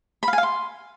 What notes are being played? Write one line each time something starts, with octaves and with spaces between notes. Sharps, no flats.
B5
F5
G#5
F5
C6